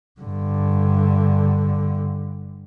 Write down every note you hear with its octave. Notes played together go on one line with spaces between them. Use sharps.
G2 D3